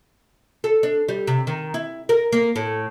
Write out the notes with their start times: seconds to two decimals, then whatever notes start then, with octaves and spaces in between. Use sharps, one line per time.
0.64 A4
0.83 D4
1.09 G3
1.27 C3
1.47 D#3
1.74 E4
2.09 A#4
2.32 A#3
2.56 A2